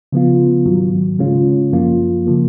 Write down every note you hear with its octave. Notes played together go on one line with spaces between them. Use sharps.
C#3 F3 B3 F4
G#2 D#3 F#3
C#3 G#3 C#4 F4
F#2 F3 A#3 F4
C#3 F3 A#3